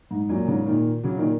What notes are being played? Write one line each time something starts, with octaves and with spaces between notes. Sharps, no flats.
G#2
F#2 A#2
G#2 C#3
A#2 D#3
C#3 F#3
A#2 D#3